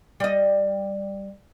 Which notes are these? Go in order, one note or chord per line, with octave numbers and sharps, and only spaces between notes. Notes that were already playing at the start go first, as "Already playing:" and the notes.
G3 D#5